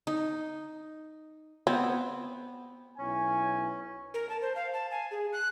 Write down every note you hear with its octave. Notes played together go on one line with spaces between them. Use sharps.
D#4
B3 C4
B1 C#4 E4 G#5
A#4
A5
C5
F5
A5
G#5
G#4
F#6